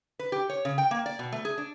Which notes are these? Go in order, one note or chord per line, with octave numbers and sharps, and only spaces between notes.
B4
G4
C#5
C#3
G5
A#3
D5
B2
A3
G#4
D4